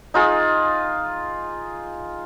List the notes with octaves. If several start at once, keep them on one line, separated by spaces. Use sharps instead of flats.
D#4 F4 G#4